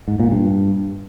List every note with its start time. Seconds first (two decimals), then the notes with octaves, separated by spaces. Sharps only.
0.08 G#2
0.20 A#2
0.31 G2